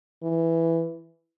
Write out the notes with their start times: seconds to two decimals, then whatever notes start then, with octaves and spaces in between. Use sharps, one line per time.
0.23 E3